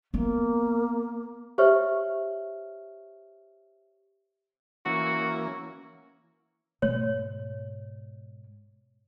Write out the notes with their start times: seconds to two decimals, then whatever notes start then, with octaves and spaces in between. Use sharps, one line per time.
0.14 A#3 B3
1.58 G4 C5 C#5 E5 C#6 F6
4.86 E3 A#3 C#4 F#4
6.82 G#2 B2 C#5